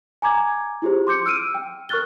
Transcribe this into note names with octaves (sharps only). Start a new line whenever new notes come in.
G#5 A#5 D6 G#6
E4 F4 G4 G#4 C5
C6 D6 G6 C#7
E6 F6 D7 D#7
G5
A#4 C#6 F6 F#6 A6 G7